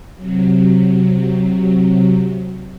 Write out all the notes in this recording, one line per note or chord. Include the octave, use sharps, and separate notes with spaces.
C3 F#3